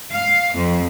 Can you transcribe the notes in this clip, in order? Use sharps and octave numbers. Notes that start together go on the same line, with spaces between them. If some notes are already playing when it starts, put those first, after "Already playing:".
F5
F2